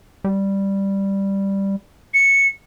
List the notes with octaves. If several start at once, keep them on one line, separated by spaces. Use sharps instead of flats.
G3
C#7